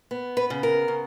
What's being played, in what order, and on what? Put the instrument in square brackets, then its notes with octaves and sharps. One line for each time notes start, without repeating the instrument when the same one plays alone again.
[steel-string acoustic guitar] B3
B4
C#3
A#4
C#3